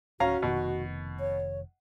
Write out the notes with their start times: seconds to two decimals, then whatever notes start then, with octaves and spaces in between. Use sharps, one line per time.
0.20 D1 C#4 F#4 F5 A#5
0.43 F1 B2 D#3
1.20 C#5